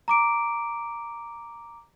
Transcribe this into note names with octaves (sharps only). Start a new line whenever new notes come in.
A#5 D6 D7